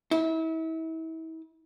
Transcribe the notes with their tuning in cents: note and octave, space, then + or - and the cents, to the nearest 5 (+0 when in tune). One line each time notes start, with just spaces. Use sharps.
E4 -35